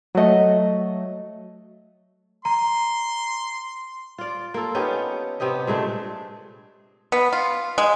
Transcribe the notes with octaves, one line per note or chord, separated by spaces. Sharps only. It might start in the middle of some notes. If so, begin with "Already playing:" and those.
F#3 A3 F#4 D#5
A#5 C6
F4 D5
A#3 F4 A4
B3 C#4 D#4 G4
C3 B3 G4 D#5
A#2 G#3 A3 D4
B3
F4
G#3